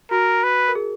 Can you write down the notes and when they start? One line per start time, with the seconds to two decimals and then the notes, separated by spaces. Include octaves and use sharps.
0.11 F#4 A#4
0.44 B4
0.68 A#4
0.75 G#4